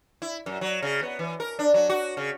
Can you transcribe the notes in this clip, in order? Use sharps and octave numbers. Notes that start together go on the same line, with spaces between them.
E4
F#2
F#3
C#3
B3
E3
A#4
D4
F#3
F#4
C#3